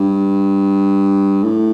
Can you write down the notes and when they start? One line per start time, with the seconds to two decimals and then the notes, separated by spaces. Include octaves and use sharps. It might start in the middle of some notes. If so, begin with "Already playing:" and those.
Already playing: G2
1.44 A2